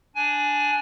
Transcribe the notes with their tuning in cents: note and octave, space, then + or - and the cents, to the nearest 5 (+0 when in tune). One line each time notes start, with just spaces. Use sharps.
D4 +5 G#5 +15